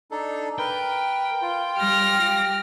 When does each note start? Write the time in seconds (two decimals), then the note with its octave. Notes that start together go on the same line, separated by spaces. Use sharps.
0.11 D4 D#4 A4
0.58 A#4 B4 G5
1.42 F4
1.78 G3 F6 A#6